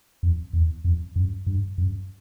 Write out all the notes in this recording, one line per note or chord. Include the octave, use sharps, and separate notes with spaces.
F2
E2
F2
F#2
G2
F#2